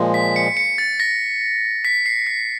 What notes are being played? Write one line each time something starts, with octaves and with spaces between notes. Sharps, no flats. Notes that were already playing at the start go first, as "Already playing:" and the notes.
Already playing: A#2 F3 G#3
B6
C#7
C#7
A6
A#6
B6
C7
B6